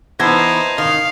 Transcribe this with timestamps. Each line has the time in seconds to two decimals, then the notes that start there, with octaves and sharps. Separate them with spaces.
0.19 E3 B3 D#4 C5 A5 G#6 A#6
0.78 D#3 F5